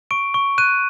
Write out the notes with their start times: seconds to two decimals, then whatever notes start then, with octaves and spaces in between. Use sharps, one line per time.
0.11 C#6 D7
0.34 C#6
0.58 F#6 D#7